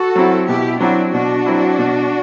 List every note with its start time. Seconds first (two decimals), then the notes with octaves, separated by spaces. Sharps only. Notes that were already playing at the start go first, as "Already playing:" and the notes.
Already playing: F#4 A4
0.16 F#3 C4 E4
0.48 B2 E4 G4
0.80 F#3 C4 D4 E4 F#4
1.13 B2 D4 F#4
1.46 F#3 C4 E4
1.78 B2